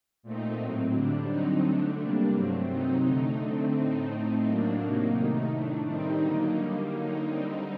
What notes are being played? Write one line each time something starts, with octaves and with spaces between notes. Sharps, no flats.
A#2 A3 C4 D#4
A2 F#3 C4
D3 G3 D4
D3 F#3 C4 D#4
D3 A3 D4
C3 G3 A#3 D4
G2 F#3 A3 C4
C3 F#3 C4 D#4
D3 A3 D#4
D3 A3 C4
A2 A3 C4 D#4
A2 A3 C4 D#4
A2 F#3 A#3 D4
C3 F#3 A#3 D#4
C3 D#3 A3 D#4
A2 A3 D4
D#3 G3 C4 D#4
D3 F#3 A#3 D#4
D3 G3 A#3
D3 F#3 A#3 D#4
D3 G3 C4 D#4